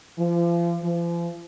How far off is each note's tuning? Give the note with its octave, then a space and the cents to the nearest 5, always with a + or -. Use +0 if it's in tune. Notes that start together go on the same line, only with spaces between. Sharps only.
F3 -35
F3 -40